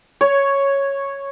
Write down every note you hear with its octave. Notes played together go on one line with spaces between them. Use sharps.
C#5